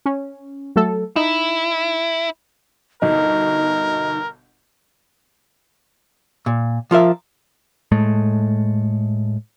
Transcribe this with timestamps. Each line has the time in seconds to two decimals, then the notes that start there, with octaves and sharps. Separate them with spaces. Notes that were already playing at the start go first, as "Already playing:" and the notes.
0.06 C#4
0.76 F#3 A3 A4
1.16 D#4 E4
3.02 G1 B2 D#4 A#4 D#5
6.46 A#2
6.91 F3 F4 A#4 E5
7.92 A2 G#3 A3